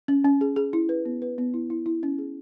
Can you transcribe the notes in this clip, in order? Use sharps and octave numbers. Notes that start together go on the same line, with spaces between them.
C#4
C#4
G#4
G#4
E4
B4
B3
B4
B3
E4
E4
E4
C#4
G#4